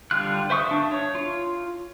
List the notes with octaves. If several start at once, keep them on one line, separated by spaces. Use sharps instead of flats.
D3 G3 F4 F#6
C5 E5 C#6 D#6
D4 E5
C#5
F4